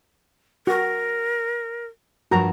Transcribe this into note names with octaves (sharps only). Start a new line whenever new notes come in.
F#4 A#4
G2 F3 F#4 A#4 A#5